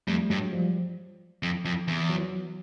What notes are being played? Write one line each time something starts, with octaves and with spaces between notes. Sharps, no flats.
F2 G3 A3
G2 F#3 G#3
F3 G3
F2
F2
E2
E3 F#3